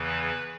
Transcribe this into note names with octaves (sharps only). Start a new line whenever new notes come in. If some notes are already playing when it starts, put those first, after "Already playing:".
Already playing: E2 C#3 E3 B4